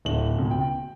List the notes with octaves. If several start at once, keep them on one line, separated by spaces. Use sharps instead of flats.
D1 F#7
C#2 B2
G5